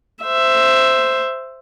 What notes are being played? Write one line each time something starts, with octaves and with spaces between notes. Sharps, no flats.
C5 E5